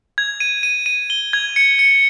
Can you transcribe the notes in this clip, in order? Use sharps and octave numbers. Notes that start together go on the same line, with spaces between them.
G#6
D#7
D#7
D#7
G7
G#6
C#7
C#7